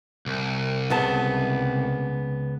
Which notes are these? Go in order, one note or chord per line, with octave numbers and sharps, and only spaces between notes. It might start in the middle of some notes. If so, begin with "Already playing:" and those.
C2
C#2 B3 A5